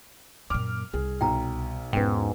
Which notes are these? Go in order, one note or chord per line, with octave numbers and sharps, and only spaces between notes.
F#2 A#2 D6 F6
C2 G#4
B1 G5 A#5
E2 G#2 C#4 B4 G5